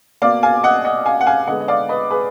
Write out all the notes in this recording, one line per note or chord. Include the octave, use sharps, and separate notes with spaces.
B2 A#3 D5 F5
F5 G#5
D#5 F#5
D#5 F#5
F5 G#5
F#5
F5 G#5
D3 G#3 B3 D#5 F#5
D#5
D5 F5
B4 D#5
G#4 B4